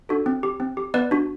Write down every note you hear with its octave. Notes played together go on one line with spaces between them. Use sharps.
D4 F#4 A4
C4
G4
C4
G4
B3 B4 D5
D4 F#4